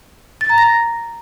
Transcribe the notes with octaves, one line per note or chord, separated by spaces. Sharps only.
A6
A#5
A#6